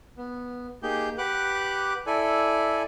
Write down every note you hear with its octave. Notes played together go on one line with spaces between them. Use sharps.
B3
A#3 D#4 G4 G#4 G6
G4 B4 F#5 D6 F#6
E4 A4 D5 G#5